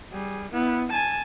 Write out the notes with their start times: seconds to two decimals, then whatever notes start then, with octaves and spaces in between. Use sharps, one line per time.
0.12 G3 G#4
0.51 B3 E4
0.89 G#5 A5